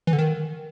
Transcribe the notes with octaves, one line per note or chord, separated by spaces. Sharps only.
E3
D3
D#3